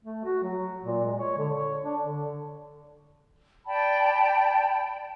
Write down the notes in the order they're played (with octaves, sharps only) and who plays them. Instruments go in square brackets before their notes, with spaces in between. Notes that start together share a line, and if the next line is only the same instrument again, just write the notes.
[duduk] A3
F#4
F#3
A#2
G#3
C#5
D3
C#5
D4
D3
[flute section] D5 G5 A5 B5